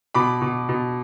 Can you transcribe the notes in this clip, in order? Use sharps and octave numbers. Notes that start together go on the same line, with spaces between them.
B2 B5 D6
B2
B2